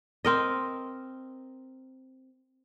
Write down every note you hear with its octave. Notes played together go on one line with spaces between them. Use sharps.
C4 A#4 D#5